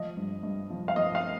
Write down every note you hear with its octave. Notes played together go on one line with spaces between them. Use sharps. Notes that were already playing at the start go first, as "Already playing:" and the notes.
Already playing: F3 D#5
G2
G2
F3
F5
F3 D#5
F5